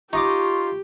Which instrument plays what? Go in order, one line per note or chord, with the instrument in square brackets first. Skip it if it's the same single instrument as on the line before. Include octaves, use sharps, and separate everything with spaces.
[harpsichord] D#4 D#5 D6 [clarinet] F4 [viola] G4 [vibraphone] C#6